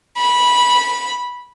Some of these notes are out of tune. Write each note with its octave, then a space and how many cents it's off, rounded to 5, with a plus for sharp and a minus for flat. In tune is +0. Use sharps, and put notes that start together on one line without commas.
B5 -15